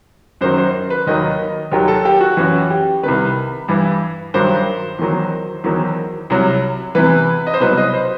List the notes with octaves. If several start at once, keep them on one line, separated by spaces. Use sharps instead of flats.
F#2 D#3 F#3 C5
C5
B4
D#2 D#3 F#3 D#5
D#2 D#3 F#3 G4
A4
G4
F#4
F#2 E3 F#4
G4
C2 C3 D#3 B4
G2 E3
G2 D#3 F#3 C5
E2 D#3 F#3
E2 D#3 F#3
C2 C3 F#3
E2 C3 E3 B4
D#5
C5
C2 B2 F#3 B4
D#5
C5